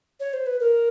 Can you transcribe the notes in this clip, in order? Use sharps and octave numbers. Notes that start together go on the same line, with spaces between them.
C#5
C5
B4
A#4